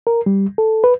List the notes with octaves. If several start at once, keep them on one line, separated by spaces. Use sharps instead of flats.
A#4
G3
A4
B4